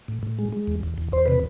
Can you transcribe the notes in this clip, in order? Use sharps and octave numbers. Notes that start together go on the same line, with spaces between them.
A2
A2
G#3
G#3
E2
E2
E2
E2 C5
C3 B4